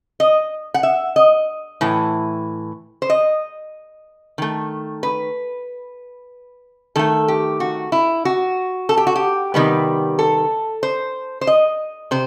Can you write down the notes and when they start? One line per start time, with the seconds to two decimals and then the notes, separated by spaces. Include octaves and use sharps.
0.20 D#5
0.74 F#5
0.83 E5
1.16 D#5
1.81 A2 E3
3.02 C5
3.10 D#5
4.38 D#3 A3
5.03 B4
6.96 D#3 A3 A4
7.28 G4
7.60 F#4
7.92 E4
8.25 F#4
8.89 A4
8.97 G4
9.07 F#4
9.16 G4
9.54 C3 D#3 G3 B3
10.19 A4
10.83 C5
11.41 C5
11.47 D#5
12.11 C3 C5